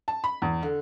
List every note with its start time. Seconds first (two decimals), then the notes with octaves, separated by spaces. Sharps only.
0.08 A5
0.24 B5
0.42 E2
0.63 D3